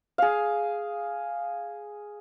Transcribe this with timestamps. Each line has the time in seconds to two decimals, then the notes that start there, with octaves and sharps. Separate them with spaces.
0.18 G#4 F5